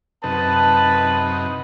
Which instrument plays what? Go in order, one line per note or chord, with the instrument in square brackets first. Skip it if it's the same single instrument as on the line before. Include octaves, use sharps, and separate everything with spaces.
[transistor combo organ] F#2 C3 D#4 [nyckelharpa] B4 [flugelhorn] A5